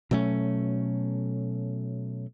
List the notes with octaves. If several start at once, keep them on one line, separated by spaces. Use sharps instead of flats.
B2 F#3 A3 C#4